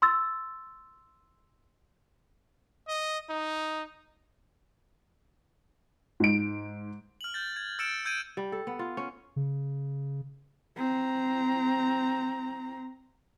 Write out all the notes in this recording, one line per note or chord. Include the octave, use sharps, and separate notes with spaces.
C6 E6 A6
D#5
D#4
G#2 D7
F6 F#7
G6 A6
G#6
E6 F6 A6 C#7 D7 E7
E6 G6 G#6 D7 D#7
G3
A4
B3
F4
C#4
C#3
C4 A#5